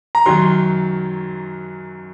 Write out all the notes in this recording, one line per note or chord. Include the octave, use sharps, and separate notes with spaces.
A#5
F#2 D#3 F#3 C6